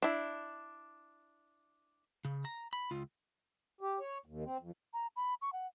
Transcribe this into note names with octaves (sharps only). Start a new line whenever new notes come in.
D4 E4
C#3
A#5
B5
C#2 F4
G4
C#5
D#2
C4
F2
A#5
B5
C#6
F#5